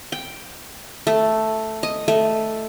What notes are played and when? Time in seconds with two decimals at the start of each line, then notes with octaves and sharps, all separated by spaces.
0.12 G5
1.07 A3
1.83 D#5
2.08 A3